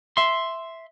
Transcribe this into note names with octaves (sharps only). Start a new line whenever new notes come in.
E5 C6